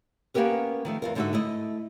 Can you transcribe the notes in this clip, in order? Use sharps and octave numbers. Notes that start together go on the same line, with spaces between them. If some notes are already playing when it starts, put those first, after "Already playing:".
A#3 B3 C#4 G4 A#4 B4
D#3 F3 A3
E2 F4 A#4
G#2 D3 D4 D#4 F#4 E5
A3 E4 D#5